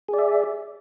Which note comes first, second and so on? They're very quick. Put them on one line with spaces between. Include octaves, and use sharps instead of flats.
G#4 D5 E5